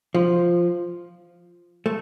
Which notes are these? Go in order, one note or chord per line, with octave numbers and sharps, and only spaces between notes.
F3
A3